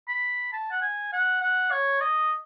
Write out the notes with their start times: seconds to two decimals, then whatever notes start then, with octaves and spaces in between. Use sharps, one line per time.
0.08 B5
0.53 A5
0.71 F#5
0.82 G#5
1.13 F#5
1.41 F#5
1.71 C#5
2.01 D#5